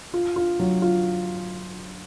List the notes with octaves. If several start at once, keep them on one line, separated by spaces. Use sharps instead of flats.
F4
F4
F#3
F4